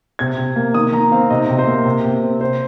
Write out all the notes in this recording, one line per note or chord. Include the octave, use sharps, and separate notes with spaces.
C3 G#6
C3
A#3
D#3 D#6
D#3 A#5
C4 F5
C3 D#5
C3
C5
A#3
C3
C3
C4
C4 C5